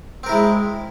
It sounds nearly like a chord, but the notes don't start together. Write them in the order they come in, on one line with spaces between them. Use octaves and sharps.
C4 A#4 E4 G#3